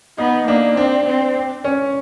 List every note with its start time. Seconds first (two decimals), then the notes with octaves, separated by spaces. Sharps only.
0.18 B3 D#4
0.48 A#3 D4
0.76 C4 D4
1.06 C4
1.64 C#4